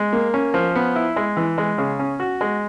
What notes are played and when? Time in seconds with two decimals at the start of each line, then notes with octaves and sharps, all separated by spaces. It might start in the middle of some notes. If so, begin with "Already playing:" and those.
Already playing: G#3
0.13 A#3
0.34 C#4
0.54 F3
0.76 B3
0.96 E4
1.16 G#3
1.37 E3
1.58 G#3
1.78 C#3
1.99 C#4
2.20 F#4
2.41 G#3